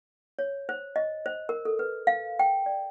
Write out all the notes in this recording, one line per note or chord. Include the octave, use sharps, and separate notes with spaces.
C#5
C5
D#5
C5
A#4
A4
B4
F5
G5
D5